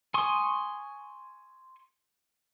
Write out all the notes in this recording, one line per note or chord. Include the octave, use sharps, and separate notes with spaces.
G#5 C6 C#6 D#6